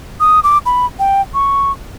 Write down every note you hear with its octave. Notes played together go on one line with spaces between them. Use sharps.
D#6
D6
B5
G5
C#6